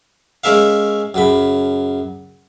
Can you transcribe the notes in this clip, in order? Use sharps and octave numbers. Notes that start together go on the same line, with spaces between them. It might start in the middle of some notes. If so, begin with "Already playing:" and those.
G#3 C#4 A#4 E5 F5
F#2 C#3 B5